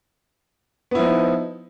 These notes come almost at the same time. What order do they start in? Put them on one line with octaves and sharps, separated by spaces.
B3 E4 F3 D#4